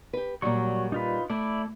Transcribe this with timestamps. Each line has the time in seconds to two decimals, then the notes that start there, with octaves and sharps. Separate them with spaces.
0.13 G4 B4
0.42 A#2 F#3 G3 C#6
0.92 D#4 F4 B4
1.30 A3 E4 D5